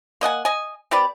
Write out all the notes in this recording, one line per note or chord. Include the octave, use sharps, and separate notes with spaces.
A#3 D#5 F#5 G#5
D#5 G#5
C4 G4 B4 D5